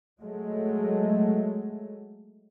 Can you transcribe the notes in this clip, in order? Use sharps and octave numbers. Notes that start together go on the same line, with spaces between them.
F#3 G#3 A3